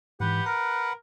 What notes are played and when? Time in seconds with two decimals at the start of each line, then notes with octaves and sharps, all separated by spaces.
0.20 G#2 E3 G4 B4 F#5
0.46 A#4 A#5